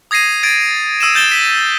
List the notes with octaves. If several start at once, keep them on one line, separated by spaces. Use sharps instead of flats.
D#6 G#6 A#6 C7 D#7
G#6 A6 D7
D#6 E6 D#7 E7
G6 A6 E7 G7
B6